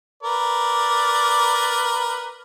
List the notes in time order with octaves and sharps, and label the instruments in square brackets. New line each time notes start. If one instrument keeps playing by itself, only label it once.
[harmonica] A#4 B4 D5